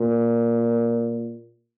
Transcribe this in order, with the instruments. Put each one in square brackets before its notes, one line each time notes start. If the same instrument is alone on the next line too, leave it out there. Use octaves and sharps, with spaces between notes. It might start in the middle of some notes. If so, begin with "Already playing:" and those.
Already playing: [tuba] A#2